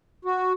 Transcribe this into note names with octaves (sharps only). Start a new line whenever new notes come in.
F#4